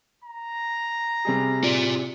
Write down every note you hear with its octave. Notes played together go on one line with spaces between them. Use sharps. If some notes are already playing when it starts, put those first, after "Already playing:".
A#5
C3 G3 G#4
F4 D5